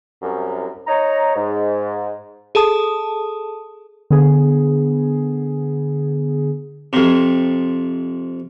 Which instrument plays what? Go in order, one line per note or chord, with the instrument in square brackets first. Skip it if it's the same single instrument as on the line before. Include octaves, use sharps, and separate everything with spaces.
[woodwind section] C2 F#2
D#4 C#5 A#5
G#2
[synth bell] G#4 A4 A5 D#6
[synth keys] D3 B3 G#4
[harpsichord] F2 C3